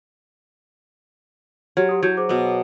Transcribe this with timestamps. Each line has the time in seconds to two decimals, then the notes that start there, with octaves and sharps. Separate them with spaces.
1.77 F#3 G4 F6 G#6
1.89 G4 D#6
2.03 F#3 E4 G6 G#6
2.17 G#4 C5 D6
2.29 B2 B3